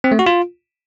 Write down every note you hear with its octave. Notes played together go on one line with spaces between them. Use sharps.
C4
A3
F#4
F4